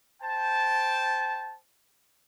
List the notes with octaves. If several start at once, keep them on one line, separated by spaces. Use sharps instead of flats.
C5 G5 A5